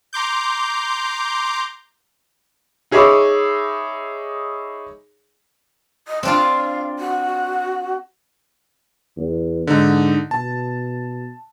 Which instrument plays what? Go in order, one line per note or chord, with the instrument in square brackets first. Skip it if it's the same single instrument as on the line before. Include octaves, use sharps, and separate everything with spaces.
[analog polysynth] A#5 C6 D6 G6
[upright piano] D#4 G#4 C#5 E5 B5 D6
[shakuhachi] D#5
[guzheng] C4 D4 F4 [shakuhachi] F5
[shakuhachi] F#4
[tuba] E2
[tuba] G#2 [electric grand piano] D3 D#4
[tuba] B2 [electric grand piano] A5